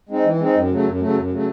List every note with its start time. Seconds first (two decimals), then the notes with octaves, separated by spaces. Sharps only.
0.09 G#3 C4 D#4
0.25 E3
0.39 G#3 C4 D#4
0.55 F#2
0.70 C#3 F#3 A3
0.85 F#2
1.00 C#3 F#3 A3
1.16 F#2
1.31 C#3 F#3 A3